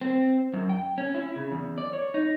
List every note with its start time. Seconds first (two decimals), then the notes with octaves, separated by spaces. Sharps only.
0.01 C4
0.54 F#2
0.69 G5
0.98 C#4
1.15 E4
1.36 C#3
1.51 E2
1.78 D5
1.93 C#5
2.14 D#4